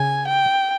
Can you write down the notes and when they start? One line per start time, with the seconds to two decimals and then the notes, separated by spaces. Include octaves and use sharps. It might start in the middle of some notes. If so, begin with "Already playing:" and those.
Already playing: C#3 G#5
0.28 G5